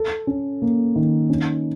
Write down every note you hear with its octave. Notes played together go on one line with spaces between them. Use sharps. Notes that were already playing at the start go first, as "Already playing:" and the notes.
Already playing: A4
C#4
A#3
D#3
C#4